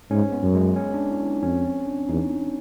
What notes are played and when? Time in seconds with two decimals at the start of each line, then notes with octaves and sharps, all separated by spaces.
0.11 G#2 C#4
0.32 B3
0.43 F#2
0.55 G#3
0.76 C#4
0.94 D4
1.10 E4
1.26 D#4
1.43 F2 C#4
1.65 C4
1.87 D4
2.09 E2 D#4